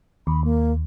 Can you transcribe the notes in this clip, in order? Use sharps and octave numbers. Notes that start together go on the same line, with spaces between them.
D#2 B5
A#3